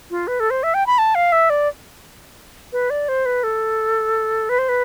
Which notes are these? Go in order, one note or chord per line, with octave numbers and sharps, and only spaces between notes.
F4
B4
A4
C5
E5
G5
B5
A5
F5
E5
D5
B4
D5
C5
B4
A4
B4
C5
B4